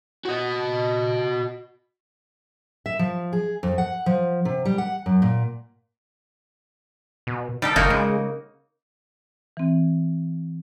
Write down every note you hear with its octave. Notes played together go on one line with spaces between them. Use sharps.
F#4 D#5
E5
F3
G#4
F2
F#5
F3
C3
G3
F#5
F#2
A#2
B2
G3 D#4 G4 A4
F#1 A#3 D#4 F#4
C#3 G#3
E3 C4